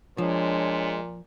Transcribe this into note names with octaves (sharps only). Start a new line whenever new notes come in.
A#2 F3 G#3 D4 C#5